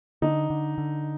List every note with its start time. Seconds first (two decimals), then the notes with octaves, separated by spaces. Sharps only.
0.22 D3 D#4
0.50 D3
0.78 D3